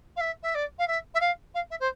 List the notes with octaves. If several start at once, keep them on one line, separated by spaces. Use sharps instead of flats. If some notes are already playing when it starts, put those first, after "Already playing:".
F5
E5
E5
D5
F5
E5
E5
F5
F5
E5
C5